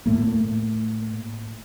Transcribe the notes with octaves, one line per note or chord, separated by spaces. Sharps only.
A2 A3 A#3